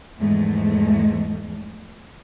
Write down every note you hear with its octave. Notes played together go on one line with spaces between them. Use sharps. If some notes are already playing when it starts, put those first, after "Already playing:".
E2 G#2 F3 G#3 A3